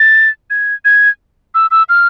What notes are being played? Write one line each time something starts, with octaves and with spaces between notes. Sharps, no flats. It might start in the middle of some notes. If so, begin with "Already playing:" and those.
Already playing: A6
G#6
G#6
E6
E6
F6